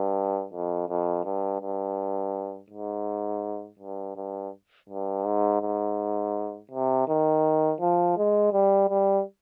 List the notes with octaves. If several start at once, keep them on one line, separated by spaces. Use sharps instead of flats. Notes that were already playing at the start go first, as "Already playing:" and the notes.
Already playing: G2
F2
F2
G2
G2
G#2
G2
G2
G2
G#2
G#2
C3
D#3
F3
G#3
G3
G3